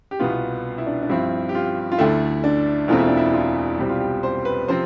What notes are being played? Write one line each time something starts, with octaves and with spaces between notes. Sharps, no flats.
G4
C2 B2 B3 F4
E4
D4
D4
G2 F3 C4 E4
G4
F4
F4
D2 D3 A3 E4
D4
E1 E2 B2 A3 C4 F4
E4
D4
E4
F4
C2 B2 G3 C4 G4
F4
G4
C5
B4
C3 F3 C4 C5